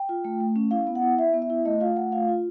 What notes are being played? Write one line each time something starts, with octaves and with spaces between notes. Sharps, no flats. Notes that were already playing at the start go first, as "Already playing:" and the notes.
Already playing: G5
F4
A3
A3
C#4
E4 F5
B3
F#5
E4
E4 E5
B3
E5
E4
A3 D#5
F4 F5
A3 F#5
F4 F5
F4